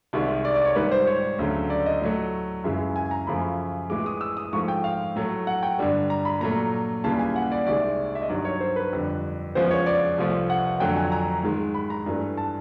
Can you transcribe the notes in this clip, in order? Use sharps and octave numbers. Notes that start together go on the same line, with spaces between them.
C2 C3 D#3 G#3
D5
D5
C#5
G#2 D#3 G3 B4
C5
C#5
D2 C#3 F#3 A3
D5
D#5
A2 F#3 A3
F#2 C#3 E3 G#3 E5
G#5
A#5
F#2 C#3 F3 A3 B5
A2 E3 G#3 D6
D#6
E6
D#6
G#2 F3 A3 C#6
G5
F5
A2 F#3 A3
F#5
G5
G2 D3 G3
A#5
B5
A#2 F#3 A3 A#5
D#2 C#3 E3 G3 A5
G#5
F#5
D5
C2 C3 D#3 G#3 D5
E5
D#5
G2 D#3 F#3 D5
C#5
C5
B4
F2 D3 G3
E2 C#3 F3 G#3 C5
C#5
D5
C2 C3 F3 A3
F#5
F2 D3 F#3 A3 G5
G#5
A#5
G#2 D#3 G#3
B5
A#5
G2 E3 A3
A5